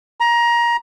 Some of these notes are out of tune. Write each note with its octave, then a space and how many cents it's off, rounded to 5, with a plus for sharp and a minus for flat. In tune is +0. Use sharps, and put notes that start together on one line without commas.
A#5 +20